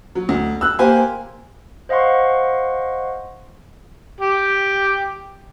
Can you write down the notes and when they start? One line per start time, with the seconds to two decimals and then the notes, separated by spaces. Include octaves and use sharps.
0.15 F#3
0.29 D2
0.61 E6 F#6
0.79 A#3 G4 C5 G#5
1.89 C5 D#5 F5 F#5 C6 C#6
4.21 G4